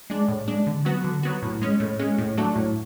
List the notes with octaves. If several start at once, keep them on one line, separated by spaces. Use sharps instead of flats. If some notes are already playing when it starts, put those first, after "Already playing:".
G#3 D4
A2
G#3 D4
D3
F#3 B3 F#4
D3
F#3 B3 F#4
A2
G#3 C#4
A2
G#3 C#4
A2
F#3 A3 D4
A2